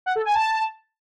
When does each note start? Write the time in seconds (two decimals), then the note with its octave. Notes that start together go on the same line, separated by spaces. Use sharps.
0.06 F#5
0.16 A4
0.25 G#5
0.35 A5